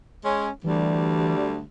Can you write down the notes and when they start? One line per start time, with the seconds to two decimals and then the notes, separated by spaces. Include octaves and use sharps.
0.25 G#3 C#4
0.64 D2 E3 G3